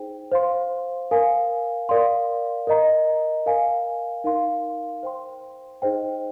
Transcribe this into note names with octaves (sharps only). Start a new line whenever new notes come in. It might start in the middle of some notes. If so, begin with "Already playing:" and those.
Already playing: D#4 G#4 C5 G5
C5 F5 C6
A#4 F5 G#5
A#4 D5 F5 C6
A#4 D#5 A#5
A#4 F5 G#5
D#4 A#4 F5 C6
C5 G5 C6
D#4 G#4 C5 D#5 G5